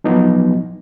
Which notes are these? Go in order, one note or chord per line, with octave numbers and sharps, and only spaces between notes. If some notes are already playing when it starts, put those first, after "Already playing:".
F3 F#3 B3 D#4